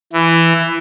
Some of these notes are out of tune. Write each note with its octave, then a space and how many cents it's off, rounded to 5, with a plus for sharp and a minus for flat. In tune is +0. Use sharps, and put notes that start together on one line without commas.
E3 +10